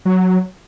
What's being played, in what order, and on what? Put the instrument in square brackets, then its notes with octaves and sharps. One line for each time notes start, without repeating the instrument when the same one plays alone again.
[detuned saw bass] F#3